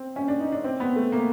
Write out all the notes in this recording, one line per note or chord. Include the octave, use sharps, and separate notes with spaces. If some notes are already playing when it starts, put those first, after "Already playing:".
Already playing: C4
C#4
D4
D#4
D4
C4
B3
A3
A#3